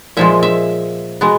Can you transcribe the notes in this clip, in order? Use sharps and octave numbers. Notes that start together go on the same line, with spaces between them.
A#2 F3 G#3 E5
E5
B2 G#3 B3